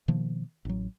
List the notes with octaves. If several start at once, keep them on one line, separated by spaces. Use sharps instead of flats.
B2 D#3 F3 A#3
A1 F#3